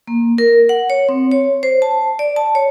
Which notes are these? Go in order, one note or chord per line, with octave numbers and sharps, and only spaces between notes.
A#3
A#4
F#5
C#5
C4
C#5
C5
A5
D5
A5
C#5